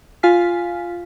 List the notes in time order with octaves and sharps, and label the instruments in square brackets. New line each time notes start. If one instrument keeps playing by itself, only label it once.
[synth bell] F4 F5 G#5 F6 B6